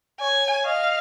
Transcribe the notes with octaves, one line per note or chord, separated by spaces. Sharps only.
C#5 G#5
D#5 F5